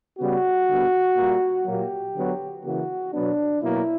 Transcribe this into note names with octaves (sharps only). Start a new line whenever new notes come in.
C#3 G3 B3 F#4
D3 G3 B3
A#2 G3 A#3
A#2 F#3 A#3 G4
D3 F#3 B3
C#3 E3 A#3 F#4
B2 F#3 B3 D4
B2 F#3 A#3 E4